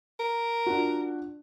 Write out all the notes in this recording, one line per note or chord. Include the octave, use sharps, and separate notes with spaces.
A#4
D4 F4 F#4